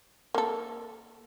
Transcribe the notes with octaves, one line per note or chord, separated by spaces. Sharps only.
A#3 A4